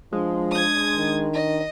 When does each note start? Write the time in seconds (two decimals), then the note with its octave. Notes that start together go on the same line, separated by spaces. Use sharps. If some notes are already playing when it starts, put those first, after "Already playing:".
0.13 F3 G#3 D4
0.51 D#6 G#6
0.97 D#3
1.33 D#5